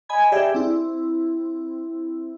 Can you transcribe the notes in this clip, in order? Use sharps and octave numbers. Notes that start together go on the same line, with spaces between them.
D#5 G#5 B5 G#6
G4 G#4 D5 E5 G5
C4 E4